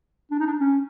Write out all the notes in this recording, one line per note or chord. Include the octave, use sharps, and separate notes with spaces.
D4
D#4
D4
C#4